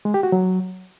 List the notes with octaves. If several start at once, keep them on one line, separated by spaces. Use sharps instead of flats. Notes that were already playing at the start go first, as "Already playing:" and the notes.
G#3
G4
F#4
F#3